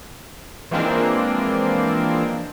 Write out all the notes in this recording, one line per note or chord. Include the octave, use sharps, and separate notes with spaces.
E3 F3 G#3 A#3 C4 D4